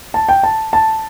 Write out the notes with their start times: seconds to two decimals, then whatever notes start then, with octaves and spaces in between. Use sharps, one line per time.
0.14 A5
0.29 G5
0.43 A5
0.73 A5